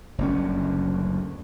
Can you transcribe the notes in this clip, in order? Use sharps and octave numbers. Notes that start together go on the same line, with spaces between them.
F#1 D2 G3 C#4